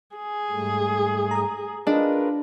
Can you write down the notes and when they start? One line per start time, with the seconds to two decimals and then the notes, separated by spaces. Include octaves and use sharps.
0.16 G#4
0.51 G#2 G3 A3
1.31 A#5 D#6
1.87 D4 F4 G#4 A#4 B4 D5 D#5